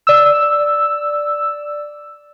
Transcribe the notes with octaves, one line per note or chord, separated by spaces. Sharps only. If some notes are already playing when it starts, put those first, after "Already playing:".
D5 E6